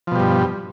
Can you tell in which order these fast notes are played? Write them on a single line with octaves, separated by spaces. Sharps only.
F3 B2 G3 G2